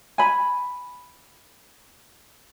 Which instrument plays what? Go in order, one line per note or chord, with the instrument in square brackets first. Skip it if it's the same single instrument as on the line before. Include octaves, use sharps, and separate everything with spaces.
[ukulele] G#5 B5